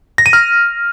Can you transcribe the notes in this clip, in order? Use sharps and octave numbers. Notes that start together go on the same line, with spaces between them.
A#6
D#7
F6